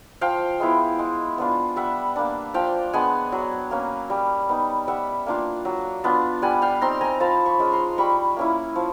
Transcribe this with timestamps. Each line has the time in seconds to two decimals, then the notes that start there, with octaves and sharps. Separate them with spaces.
0.21 F3 F5 G5
0.60 G#3 B3 E4
0.99 G#3
1.38 B3 D4 F4
1.76 G3 E5 F#5
2.16 A#3 D4
2.54 F3 F5 G5
2.93 G#3 B3 D4 F#5 G#5
3.32 F#3
3.71 A#3 C#4
4.10 G3
4.49 B3 D#4
4.87 G3 E5 F#5
5.26 A#3 D4 F4
5.65 F#3
6.04 B3 D4 F4
6.42 G3 F#5 G#5
6.62 F5 G5
6.81 C4 D#4 A#5 C6
7.01 G#5 A#5
7.20 F3 A5 B5
7.46 B5 C#6
7.59 G#3 C#4 F4
7.72 A#5 C6
7.98 G3 B5 C#6
8.36 A#3 C#4 E4
8.76 F3